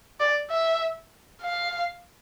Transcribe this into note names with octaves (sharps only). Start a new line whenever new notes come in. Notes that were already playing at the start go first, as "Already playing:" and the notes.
D5
E5
F5